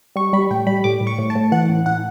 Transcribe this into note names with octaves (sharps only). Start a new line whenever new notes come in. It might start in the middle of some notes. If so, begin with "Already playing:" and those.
G3 C#6
G3 B5
A2 G5
G3 B5
A2 D6
A2
C#6
A2
A5
A2
E3 F#5
A2
A2 F#5